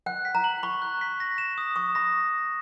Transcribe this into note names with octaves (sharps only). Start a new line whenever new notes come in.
F#5 F#6
B6
A#5
F#7
B5 C#6
F#6
B6
A#6
E7
D#6
C#6 D#6
B5 A#6